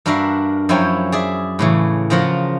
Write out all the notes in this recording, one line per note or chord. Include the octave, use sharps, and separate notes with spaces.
G2 D4 F#4 A#4 E5 F5
F#2 F3 E4 C#5 G5 G#5
G#4 D5 E5
A2 C#3 E3
C#3 F3 F4 A#4 F#5 A#5